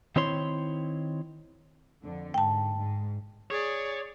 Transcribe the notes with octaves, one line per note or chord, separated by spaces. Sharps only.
D#3 C4 E4 C#5 C6
F2 D3
G#2 G5 A5
G#2
G#4 C#5 D5